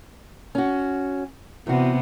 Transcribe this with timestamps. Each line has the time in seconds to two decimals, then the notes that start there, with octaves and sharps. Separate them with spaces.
0.55 C#4 F#4
1.67 E2 C3 B3 F#4